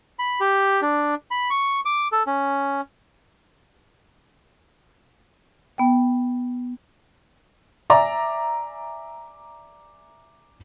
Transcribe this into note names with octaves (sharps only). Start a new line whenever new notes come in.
B5
G4
D4
B5
C#6
D6
A4
C#4
B3 G5
D5 E5 G#5 A#5 D6